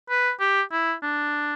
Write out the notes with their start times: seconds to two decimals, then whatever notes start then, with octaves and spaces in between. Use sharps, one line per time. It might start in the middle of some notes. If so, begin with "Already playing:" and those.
0.10 B4
0.40 G4
0.72 E4
1.03 D4